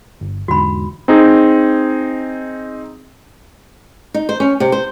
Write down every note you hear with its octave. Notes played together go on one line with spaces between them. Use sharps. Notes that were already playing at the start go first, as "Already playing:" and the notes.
G1
E2 G#2 D3 F#4 B5
C4 D#4 G#4
D#4
C5
C#4
C3
C5